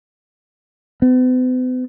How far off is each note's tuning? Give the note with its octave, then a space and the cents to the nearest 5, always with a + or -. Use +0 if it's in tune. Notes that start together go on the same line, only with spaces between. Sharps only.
B3 +45